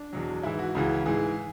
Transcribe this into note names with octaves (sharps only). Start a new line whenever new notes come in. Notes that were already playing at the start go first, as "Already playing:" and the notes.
Already playing: D4
E2 B2 F#3
G#2 E3 E4
F#4
C#2 C#3 E3
G#2 E3 G#4